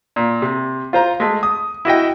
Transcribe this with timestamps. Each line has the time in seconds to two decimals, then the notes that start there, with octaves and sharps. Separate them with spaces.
0.16 A#2
0.42 C3
0.93 F4 C5 A#5
1.20 G#3 A3
1.43 D#6
1.85 E4 F#4 D#5 G5